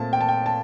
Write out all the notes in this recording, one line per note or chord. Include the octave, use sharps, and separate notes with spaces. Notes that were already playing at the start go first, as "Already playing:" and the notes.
Already playing: A#2 A3 C4 A5
G5
A5
G5
A5